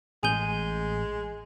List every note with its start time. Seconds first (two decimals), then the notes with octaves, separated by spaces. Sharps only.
0.23 A1 G#3 G#4 G#5 G6 D#7 G7